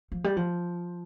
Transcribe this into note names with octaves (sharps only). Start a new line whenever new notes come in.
F3
G3
F3